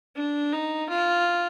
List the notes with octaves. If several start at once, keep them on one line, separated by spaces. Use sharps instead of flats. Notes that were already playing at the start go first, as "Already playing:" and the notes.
D4
D#4
F4